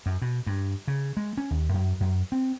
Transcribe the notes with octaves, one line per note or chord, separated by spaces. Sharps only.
F#2
B2
G2
C#3
G#3
C#4
D#2
F#2
F#2
C4